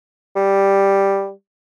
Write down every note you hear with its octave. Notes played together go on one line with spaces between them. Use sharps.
G3